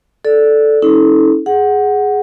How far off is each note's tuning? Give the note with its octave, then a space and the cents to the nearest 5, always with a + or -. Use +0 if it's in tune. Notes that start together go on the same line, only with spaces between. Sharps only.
A4 -5 D5 +0
C#4 +0 E4 -45 A4 -15
G#4 +0 F#5 +0